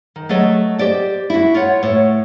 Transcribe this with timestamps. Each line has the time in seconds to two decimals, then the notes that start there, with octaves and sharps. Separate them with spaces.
0.16 D#3
0.29 F#3 A3 A4 D#5
0.78 G4 C5 D5 D#5
1.30 E4 F#4
1.55 F4 C#5 F#5
1.83 A2 C#5